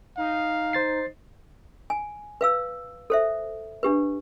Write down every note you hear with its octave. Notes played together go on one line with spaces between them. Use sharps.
D#4 F5
C5 A6 C7
G#5
B4 F5 E6
A4 C5 E5
D4 G4 B4